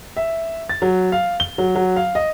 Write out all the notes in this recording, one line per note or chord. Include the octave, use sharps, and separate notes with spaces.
E5
A6
F#3
F5
G7
F#3
F#3
F5
D#5